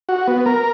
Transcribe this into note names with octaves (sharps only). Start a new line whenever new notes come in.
F#4
B3
A#4